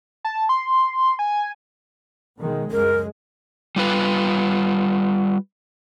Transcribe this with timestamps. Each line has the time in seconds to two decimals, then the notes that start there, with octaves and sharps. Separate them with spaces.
0.25 A5
0.49 C6
1.19 G#5
2.39 B2 D#3 G#3
2.71 C#2 F#2 G#3 A#4
3.76 G3 F4 B4